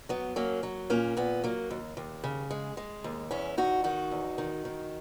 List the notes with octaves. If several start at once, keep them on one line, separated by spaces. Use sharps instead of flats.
F#3 B3
F#3 A#3 C#4
F#3
A#2 A#3 C#4
A#2 B3
F#3 A#3
D#2
D#2
C#3
G#3
G#3
D#2
E2 C#4 E4
E2 D#4 F#4
D#3 D#4 F#4
E2
D#3
D#3